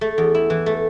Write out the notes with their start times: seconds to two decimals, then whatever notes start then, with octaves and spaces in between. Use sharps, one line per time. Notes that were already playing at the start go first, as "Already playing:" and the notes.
0.01 A3
0.18 E2
0.34 E4
0.50 E3
0.66 A3